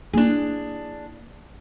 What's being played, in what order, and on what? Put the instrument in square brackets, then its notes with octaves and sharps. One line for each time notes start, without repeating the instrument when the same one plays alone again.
[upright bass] A#3 E4 [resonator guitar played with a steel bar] D4 G#4